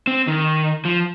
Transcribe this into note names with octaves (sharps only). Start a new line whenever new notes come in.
C4
D#3
F3